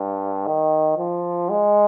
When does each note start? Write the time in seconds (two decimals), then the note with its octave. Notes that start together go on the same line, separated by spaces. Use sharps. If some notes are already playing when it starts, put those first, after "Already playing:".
Already playing: G2
0.47 D#3
0.98 F3
1.50 G#3